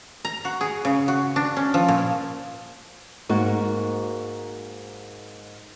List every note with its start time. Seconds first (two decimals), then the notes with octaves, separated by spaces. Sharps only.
0.25 A#5
0.45 F#4
0.61 G#4
0.85 C#3
1.08 F#4
1.36 D4
1.57 C#4
1.74 F3
1.88 A#2
3.29 G#2 A#3 F#4